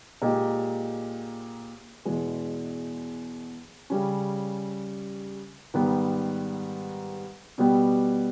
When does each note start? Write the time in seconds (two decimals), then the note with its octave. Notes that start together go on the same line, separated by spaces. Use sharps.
0.22 A#2 G#3 D#4 G4
2.05 E2 B2 G#3
3.90 C#3 G3 C#4
5.74 G#2 D#3 G3 B3
7.58 B2 G3 B3 G4